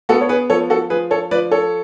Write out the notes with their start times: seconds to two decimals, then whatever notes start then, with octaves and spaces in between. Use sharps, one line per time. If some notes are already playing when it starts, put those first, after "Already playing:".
0.09 B3 F#4 A4
0.21 C#5
0.29 G#4 B4
0.50 F3 A4 C#5
0.70 F#4 A4
0.90 F3 G#4 B4
1.11 A4 C#5
1.31 F3 B4 D5
1.51 A4 C#5